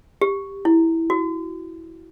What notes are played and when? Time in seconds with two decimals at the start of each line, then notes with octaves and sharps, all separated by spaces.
0.21 G4
0.65 E4
1.10 F#4